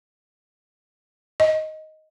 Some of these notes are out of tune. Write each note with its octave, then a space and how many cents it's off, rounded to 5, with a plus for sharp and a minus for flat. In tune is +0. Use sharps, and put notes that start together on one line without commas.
D#5 +5